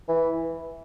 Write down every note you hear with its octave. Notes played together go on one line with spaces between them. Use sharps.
E3